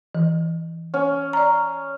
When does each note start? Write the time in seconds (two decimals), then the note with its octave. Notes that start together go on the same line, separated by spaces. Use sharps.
0.15 E3
0.94 C#4
1.33 D5 A#5